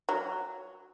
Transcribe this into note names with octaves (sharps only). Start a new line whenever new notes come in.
F#3